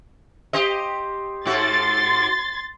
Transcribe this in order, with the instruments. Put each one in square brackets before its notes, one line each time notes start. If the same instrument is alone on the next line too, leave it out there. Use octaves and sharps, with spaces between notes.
[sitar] G4 C5 D#5
[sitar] G#2 F#4 [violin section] C6 A6